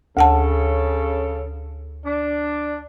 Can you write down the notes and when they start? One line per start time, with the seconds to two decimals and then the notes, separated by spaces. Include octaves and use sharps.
0.17 D2 C#3 A4 F#5 A5
2.04 D4